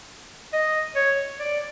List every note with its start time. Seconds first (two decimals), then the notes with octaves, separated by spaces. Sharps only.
0.53 D#5
0.96 C#5
1.39 D5